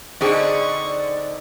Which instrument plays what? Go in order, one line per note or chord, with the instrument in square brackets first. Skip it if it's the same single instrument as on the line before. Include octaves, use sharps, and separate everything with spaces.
[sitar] D3 C4 D#4 [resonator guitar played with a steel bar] D4 G#4 [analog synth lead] D5 [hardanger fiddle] C#6